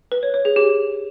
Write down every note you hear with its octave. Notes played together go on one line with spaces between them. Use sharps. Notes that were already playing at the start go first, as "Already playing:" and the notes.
B4
C#5
C#5
G#4
G4